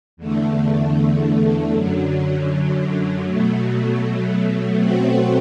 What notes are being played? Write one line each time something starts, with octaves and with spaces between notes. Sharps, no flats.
E2 D3 A3
F#2 D3 F#3
B2 F#3 A3
B2 F#3 A3 C4 F#4